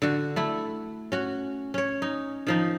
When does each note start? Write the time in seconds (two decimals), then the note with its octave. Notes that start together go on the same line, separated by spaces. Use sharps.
0.02 D3 F#4
0.36 A3 E4
1.12 C#4 F#4
1.74 C#4 C#5
2.02 D#4
2.47 D#3 F3 D#4